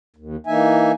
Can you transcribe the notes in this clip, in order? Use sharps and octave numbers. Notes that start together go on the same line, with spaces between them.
D#2
E3 A#3 D#4 E5 G#5